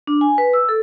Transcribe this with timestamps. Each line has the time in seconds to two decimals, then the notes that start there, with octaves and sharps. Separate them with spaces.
0.07 D4
0.21 G#5
0.38 B4
0.53 E6
0.69 A4